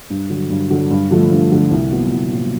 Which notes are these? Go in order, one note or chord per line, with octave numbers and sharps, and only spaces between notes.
G2
D3 F#3
G2
D3 F#3
G2
D3 F3 A3
G2
D3 F3 A3
C2
A#2 F#3 B3
C2
A#2 F#3 B3